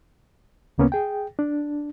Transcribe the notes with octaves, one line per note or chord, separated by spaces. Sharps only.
D2 C#3 A#3 B3 C#4
G#4 G5
D4